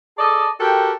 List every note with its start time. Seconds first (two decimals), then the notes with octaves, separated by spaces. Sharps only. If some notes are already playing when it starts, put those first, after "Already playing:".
0.18 G#4 A4 D5 D#5 A5
0.59 F#4 G4 A4 A#4 G5